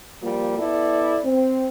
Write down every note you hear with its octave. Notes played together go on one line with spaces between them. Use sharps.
F3 G3 A#3 F4
B3 E4 A4 D5
C4